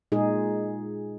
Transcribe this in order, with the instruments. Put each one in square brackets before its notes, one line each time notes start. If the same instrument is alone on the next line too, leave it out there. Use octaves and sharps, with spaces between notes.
[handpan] A#2 G#3 D#4 G#4